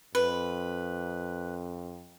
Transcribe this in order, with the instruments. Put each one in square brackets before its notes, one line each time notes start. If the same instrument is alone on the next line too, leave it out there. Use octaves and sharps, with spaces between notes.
[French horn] F2 [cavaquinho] B4